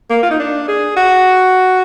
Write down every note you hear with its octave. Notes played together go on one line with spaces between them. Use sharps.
A#3
F4
D#4
D4
G#4
F#4